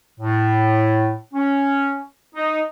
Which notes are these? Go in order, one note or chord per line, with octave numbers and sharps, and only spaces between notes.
A2
C#4
D#4